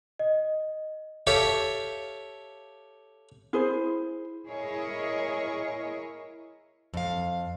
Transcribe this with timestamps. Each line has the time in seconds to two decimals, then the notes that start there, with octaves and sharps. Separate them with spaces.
0.19 D#5
1.27 G4 A4 C#5 E5 F5
3.53 E4 G#4 C5
4.48 E4 G#4 A#4 C#5 D#5
6.94 F2 F5